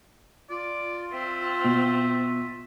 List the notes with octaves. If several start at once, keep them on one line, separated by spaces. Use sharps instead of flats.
F4 D5
C4 E5
B2